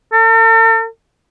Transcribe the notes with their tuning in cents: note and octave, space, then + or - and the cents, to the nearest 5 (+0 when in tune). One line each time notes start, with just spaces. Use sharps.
A4 +45